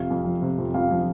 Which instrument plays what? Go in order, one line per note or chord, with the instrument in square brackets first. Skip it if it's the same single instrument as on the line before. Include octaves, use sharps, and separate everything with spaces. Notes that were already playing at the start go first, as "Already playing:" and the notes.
Already playing: [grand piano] F2 C3 F5
F2
F3
C3
F2
F2 F5
F3